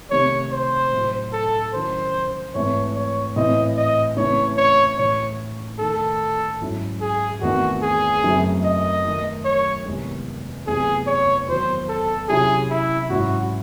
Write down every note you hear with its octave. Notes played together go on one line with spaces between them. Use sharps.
C3 D#3 A3 C4 D#4 C#5
C5
A2 F#3 A3
A4
D#3 F#3 C#4 E4 C5
G#2 E3 A3 C4 C#5
C#5
A2 E3 C4 E4 D#5
D#5
C#3 E3 A3 C4 E4 C#5
C#5
A2 E3 A3 C#5
D#3 A3 D#4 A4
G#2 F#3 C#4 E4
G#4
E2 D#3 A3 C4 D#4 F#4
G#4
F#2 C#3 F#3 A3 C4
D#5
D#3 A3 D#4
C#5
E2 C3 D#3 G#3
E2 C3 F#3 A3 C4 G#4
C#5
E2 D#3 F#3 C5
A4
C3 F#3 C#4 E4 G#4
E4
G#2 F#3 C#4 E4 F#4